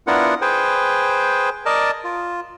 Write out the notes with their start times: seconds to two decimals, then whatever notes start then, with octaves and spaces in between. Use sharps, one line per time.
0.07 B3 D4 E4 F4 A#4 F#5
0.41 G#4 B4 C5 G5
1.66 A#4 D5 D#5 A5
2.04 F4